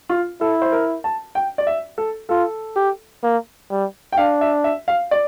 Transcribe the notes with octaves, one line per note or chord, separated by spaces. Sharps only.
F4
E4 A4
C5
A#4
A5
G5
D5
E5
A4
F4 A4
G4
A#3
G3
G5
D4 F5
E5
E5
F5
D5